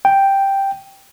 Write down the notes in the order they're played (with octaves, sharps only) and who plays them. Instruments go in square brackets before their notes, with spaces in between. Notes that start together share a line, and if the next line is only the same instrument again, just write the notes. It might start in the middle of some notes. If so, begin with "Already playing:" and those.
[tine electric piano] G5